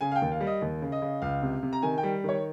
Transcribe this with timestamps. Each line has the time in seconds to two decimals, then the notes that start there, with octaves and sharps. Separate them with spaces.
0.01 C#3 G#5
0.12 F5
0.16 G5
0.22 D#2
0.32 F5
0.41 G3
0.47 D#5
0.62 D#2
0.82 C#3
0.92 D#5
1.02 C#3
1.22 C#2 F5
1.42 C3
1.63 C3
1.73 A#5
1.82 D#3 G#5
1.98 G5
2.03 G3
2.24 D#3 C#5